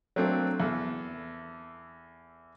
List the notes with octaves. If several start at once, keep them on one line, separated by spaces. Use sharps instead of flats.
F#3 A3 A#3 C4 D4
E2 A4